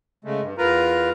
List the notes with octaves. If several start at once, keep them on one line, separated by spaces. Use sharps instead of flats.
C#3 G#3 A3
G2
E2 F4 A#4 B4 A#5